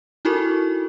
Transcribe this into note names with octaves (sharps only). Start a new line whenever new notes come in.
D#4 E4 F#4 A4 A#4 C#6